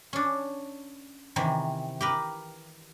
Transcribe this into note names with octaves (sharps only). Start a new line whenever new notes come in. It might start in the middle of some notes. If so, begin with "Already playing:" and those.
C#4 D4
C3 D#3 E3
G4 A#4 B4